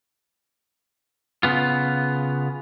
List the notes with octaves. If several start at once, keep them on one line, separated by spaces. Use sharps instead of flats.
C#3 B3 F4